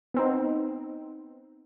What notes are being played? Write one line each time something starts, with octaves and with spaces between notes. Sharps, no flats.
B3 C4 D#4